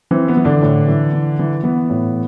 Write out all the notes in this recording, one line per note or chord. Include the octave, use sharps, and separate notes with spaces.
E3 C4
B3
E3
D3 D4
A2
E3
E3
E3
E3 B3
A2